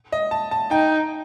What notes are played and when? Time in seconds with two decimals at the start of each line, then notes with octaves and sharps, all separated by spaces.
0.12 D#5
0.31 A5
0.51 A5
0.71 D#4 G5